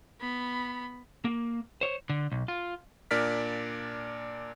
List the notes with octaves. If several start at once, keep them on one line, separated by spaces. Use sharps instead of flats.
B3 B5
A#3
C5 C#5
D3
B1
F4
A#2 D4 A#4 D5 F6 B6